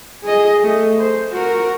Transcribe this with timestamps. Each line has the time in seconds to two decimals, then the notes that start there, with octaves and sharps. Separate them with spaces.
0.24 G#4 D#5
0.63 A3
0.99 C5
1.33 F#4 A#4